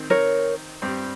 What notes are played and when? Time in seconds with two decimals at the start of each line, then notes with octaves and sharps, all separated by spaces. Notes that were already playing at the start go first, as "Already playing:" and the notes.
Already playing: D#3 C4
0.10 A#4 C#5
0.82 G2 G3 C4 G4